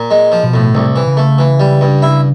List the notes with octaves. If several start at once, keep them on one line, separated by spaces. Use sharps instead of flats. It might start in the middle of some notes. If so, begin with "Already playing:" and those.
Already playing: A#2
G#3
F3
B2
A2
C2 C3
E3
C#3
A3
E3
G3
G2
E4